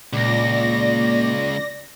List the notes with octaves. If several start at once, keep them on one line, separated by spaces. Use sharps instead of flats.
C#2 A#2 D5 A#6